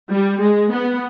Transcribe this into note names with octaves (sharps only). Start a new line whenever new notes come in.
G3
G#3
B3